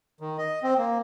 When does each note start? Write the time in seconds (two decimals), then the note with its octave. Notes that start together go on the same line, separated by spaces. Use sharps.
0.21 D#3
0.38 D#5
0.63 C4
0.78 A#3